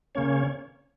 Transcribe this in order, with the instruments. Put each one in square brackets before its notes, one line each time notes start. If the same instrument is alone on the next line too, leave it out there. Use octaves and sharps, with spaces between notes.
[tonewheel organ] C#3 A#3 C#4 C#5